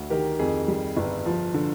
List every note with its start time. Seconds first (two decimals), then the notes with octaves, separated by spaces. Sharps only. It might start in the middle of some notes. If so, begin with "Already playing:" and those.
Already playing: D2
0.10 D#3 G4 A#4
0.39 F2 G#4
0.68 G3
0.97 G1
1.25 F3
1.54 D3